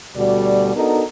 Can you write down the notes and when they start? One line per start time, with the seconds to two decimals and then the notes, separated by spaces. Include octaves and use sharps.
0.16 D2 B2 G3 F#4 A4 D5
0.75 B3 D4 D#4 F#4 A4 A#4